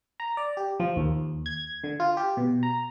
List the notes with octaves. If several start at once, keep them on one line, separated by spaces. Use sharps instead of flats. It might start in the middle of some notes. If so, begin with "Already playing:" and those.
A#5
D5
G4
F3
D#2
G#6
D3
F4
G4
B2
A#5